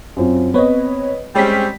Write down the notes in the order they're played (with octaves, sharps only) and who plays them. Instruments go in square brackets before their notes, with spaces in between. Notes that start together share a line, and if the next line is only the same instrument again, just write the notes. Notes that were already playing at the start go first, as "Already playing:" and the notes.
[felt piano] F#2 C4 F4
[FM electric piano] B3 C4 C#5 [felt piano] B4 D#5
[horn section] G3 C4 C#4 [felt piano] G#3 [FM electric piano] G4 B6